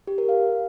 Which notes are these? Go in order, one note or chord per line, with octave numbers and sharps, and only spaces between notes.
G4
A#4
F5